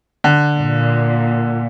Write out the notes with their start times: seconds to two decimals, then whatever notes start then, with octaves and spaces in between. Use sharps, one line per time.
0.24 D3
0.58 A#2